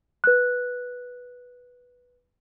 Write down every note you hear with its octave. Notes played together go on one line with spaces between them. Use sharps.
B4 F#6